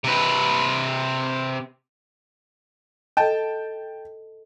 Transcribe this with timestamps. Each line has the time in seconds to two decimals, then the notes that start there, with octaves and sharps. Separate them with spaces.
0.04 C3 B4
3.17 A4 D#5 G5 A5